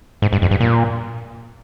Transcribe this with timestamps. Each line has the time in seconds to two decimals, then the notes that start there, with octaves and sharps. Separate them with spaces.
0.22 G#2
0.33 G2
0.42 F2
0.51 G2
0.60 A#2